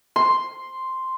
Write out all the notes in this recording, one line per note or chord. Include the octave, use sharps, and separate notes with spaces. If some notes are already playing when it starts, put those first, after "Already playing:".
C6